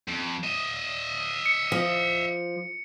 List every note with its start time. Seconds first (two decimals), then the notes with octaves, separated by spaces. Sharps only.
0.08 F2
0.44 D#5 E5
1.46 C#7
1.72 F3